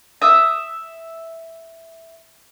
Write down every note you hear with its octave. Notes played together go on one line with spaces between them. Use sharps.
E5 D#6